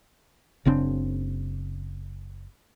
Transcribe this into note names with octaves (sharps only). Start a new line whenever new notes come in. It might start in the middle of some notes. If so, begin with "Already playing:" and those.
F#1 C#3 C4 D4